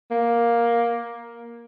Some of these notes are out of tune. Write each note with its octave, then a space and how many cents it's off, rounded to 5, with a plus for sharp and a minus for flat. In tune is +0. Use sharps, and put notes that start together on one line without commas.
A#3 +10